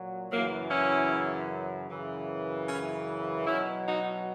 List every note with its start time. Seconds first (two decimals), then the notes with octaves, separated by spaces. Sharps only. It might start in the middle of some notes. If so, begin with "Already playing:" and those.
Already playing: A#2 F#3
0.31 F#2 C#3 E3 F#3 A#3
0.70 C#4 E4
1.89 F#2 C#3 E3
2.69 C#4 E4
3.47 B2 F#3 C#4 E4
3.87 D#4 F#4